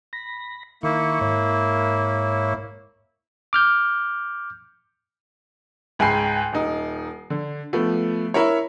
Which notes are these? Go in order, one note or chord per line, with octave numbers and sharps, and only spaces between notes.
B5 A#6
D#3 A#3 E4 C#6
G#2 C#5
D6 F6 G6
C#2 G#2 G5 G#5 B5 C7
D#1 D#4
D3
F3 A3 B3
E4 A#4 C#5